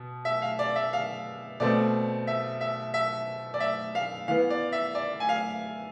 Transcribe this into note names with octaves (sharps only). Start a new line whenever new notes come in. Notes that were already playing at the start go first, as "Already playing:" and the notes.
Already playing: B2
E5
F5
D5
E5
F5
B2 A3 C4 D5
E5
E5
E5
D5
E5
F5
E3 B3 F5
D5
E5
D5
G#5
F5